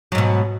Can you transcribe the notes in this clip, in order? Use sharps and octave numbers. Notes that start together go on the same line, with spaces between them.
G#2 B2 F#3